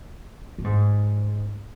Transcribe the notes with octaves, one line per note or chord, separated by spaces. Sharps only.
A#2
G#2